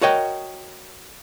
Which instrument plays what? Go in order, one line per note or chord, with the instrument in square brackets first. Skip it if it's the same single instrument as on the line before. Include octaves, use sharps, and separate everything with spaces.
[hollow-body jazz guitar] F#4 A#4 C#5 D#5 G5